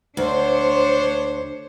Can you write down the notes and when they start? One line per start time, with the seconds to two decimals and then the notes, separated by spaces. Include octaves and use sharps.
0.17 D2 D4 C5 C#5